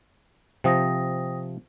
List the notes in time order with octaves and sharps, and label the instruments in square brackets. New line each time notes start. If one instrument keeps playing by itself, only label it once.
[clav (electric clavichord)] C3 F3 [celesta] G5 D#6 A#6